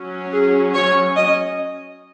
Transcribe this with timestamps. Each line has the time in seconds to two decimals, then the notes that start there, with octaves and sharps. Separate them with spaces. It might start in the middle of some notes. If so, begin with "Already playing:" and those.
Already playing: F#3 C#4
0.32 G#4
0.74 C#5
1.16 D#5